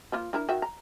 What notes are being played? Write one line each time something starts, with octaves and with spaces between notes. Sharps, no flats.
F3 A#3 F4
D4 E4 A#4
D#3 F#4 E5
A#5